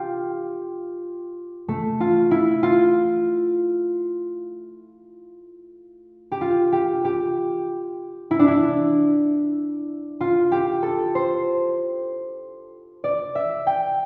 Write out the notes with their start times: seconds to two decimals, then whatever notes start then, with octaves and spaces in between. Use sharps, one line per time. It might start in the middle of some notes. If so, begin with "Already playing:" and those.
Already playing: F4 G4
1.68 A3
2.00 F4
2.31 E4
2.63 F4
6.32 G4
6.41 F4
6.72 G4
7.05 G4
8.31 E4
8.39 D4
8.48 E4
10.21 F4
10.52 G4
10.83 A4
11.15 C5
13.04 D5
13.35 E5
13.67 G5